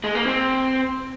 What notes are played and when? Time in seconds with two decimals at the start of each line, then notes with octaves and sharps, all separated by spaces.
0.04 G#3
0.15 A#3
0.27 C4